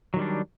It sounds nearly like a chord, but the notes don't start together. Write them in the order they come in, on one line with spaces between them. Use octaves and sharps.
F#3 D#3 G3 D4